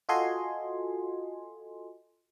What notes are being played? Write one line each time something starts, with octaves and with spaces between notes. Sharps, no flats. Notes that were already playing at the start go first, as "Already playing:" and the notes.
F4 F#4 A4 D#5 G#5 C6